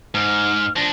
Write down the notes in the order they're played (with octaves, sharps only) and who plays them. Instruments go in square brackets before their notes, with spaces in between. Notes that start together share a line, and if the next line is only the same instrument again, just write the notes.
[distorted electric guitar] G#2 [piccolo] F6
[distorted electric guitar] F3 D4 [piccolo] A#6